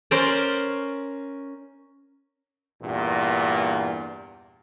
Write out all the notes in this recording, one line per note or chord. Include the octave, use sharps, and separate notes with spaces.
C#4 A#4 C5 D5
E2 G2 A#2